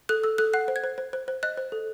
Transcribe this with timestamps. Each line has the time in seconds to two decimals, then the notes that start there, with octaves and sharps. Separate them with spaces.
0.09 A4 F#6
0.24 A4 E6
0.38 A4 F#6
0.54 F#5 F#6
0.68 C5
0.76 G#6
0.84 C5
0.98 C5
1.13 C5
1.28 C5
1.43 D#5 F#6
1.58 C5
1.72 A4